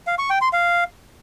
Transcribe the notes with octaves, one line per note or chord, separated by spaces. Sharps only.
F5
C#6
G5
C6
F5